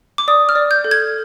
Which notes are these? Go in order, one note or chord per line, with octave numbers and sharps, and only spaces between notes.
D6
D5 D#6
F6
D5
G6
A4
G#6